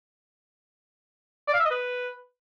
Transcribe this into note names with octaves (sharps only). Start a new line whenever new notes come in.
D5
F5
E5
D#5
B4